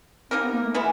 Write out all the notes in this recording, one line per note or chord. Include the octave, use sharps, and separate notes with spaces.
A#3 C4 D#4 G4 A#4
B3
A#3
A3
E3 G#3 B3 E4